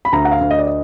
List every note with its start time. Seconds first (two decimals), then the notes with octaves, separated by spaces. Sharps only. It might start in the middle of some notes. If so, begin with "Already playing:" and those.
0.05 B5
0.13 D2 A#5
0.25 F#5
0.31 F5
0.41 D2
0.51 D#5
0.59 D5
0.67 D#5